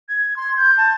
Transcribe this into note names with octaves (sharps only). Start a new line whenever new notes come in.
G#6
C6
G6
A5